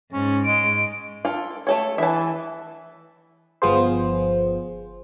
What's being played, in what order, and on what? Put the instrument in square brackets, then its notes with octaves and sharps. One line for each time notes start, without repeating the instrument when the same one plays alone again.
[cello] G#2 [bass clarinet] C#4
[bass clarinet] G#3 [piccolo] D7
[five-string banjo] F4 A4
A3 A4 C#5
[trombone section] E3 [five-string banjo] E5 A5
[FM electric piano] G1 F3 B3 F4 G#4 C5